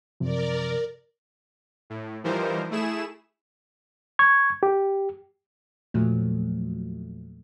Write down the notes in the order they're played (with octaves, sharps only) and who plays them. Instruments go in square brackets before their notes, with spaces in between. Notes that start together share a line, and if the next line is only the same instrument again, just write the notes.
[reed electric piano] F#2 C3 F3 [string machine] A#4 D5
[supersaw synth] A2
E3 F3 G3 D#4 A#4 C5
A3 E4 G#4 E7
[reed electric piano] C#6 G#6
G4
[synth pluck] E2 A#2 F3 F#3 A3